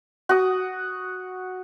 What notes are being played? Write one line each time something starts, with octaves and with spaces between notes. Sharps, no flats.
F#4 D#6